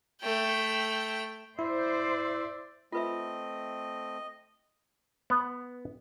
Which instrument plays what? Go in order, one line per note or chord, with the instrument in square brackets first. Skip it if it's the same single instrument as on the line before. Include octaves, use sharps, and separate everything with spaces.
[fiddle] A3 G5
[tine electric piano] E4 [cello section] C5 [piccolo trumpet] D5 [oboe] E5
[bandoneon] A3 C4 [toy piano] F4 B4 E5 [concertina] D#5
[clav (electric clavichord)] B3